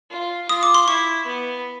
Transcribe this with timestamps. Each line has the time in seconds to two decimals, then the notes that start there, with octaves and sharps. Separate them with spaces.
0.11 F4
0.49 F4 D#6
0.63 D6
0.75 C6
0.88 E4 C#6
1.26 B3